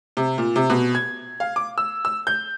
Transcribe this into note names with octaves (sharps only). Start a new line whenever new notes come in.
C3
A#2
C3
B2
G#6
F5
D6
E6
E6
G6